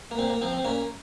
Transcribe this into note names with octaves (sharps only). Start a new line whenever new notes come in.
A#3
A#2 C4
A#3
F3 C4
C4
A#2 A#3 C#4